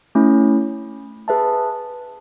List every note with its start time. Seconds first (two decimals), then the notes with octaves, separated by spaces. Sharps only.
0.15 A3 C#4 E4
1.28 G#4 B4 E5 A5